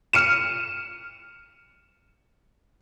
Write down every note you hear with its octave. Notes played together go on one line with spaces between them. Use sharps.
F6 C#7 D#7 E7